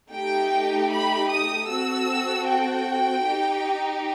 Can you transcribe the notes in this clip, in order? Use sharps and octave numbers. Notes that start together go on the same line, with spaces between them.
A3 D#4 G4 G5
B5
D#6
C4 F#4 A4 E6
G5
D#4 G4